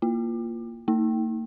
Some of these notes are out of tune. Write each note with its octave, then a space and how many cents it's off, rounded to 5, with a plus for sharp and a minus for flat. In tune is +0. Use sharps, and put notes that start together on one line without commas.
A#3 +0 F4 +0
A#3 -45 D#4 +25